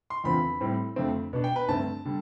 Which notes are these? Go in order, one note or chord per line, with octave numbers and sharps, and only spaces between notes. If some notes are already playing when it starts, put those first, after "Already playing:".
C6
E2 D3 F3 C4 B5
A2 G3 C4
F2 D3 A3 C4
B2 B3 D4
G5
B4
G2 D3 A3 C4 A5
D3 G3